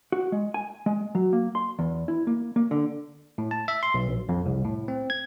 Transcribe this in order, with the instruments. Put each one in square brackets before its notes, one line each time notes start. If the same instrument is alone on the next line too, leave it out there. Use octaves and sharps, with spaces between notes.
[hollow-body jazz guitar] F#4
G#3
G#5
G#3
F#3
A#3
C6
E2
E4
A#3
A#3
D3
[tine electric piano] A2
A5
E5
C6
B1
A#1
F2
C2
A2
C4
G#6